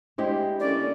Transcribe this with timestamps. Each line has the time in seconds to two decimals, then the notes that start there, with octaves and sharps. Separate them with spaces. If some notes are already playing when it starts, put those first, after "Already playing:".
0.18 G#3 D4 E4 G4 C5 D#5
0.60 D3 A#3 C#4 D5